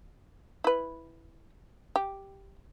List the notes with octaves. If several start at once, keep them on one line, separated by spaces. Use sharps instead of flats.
E4 B4
G4